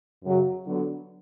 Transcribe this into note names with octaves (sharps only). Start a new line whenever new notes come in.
F#2 C#3 F#3
D3 F#3 B3 F#4